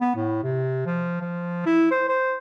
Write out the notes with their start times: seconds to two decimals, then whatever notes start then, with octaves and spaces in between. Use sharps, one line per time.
0.01 B3
0.15 A2
0.43 C3
0.86 F3
1.21 F3
1.66 E4
1.91 C5
2.08 C5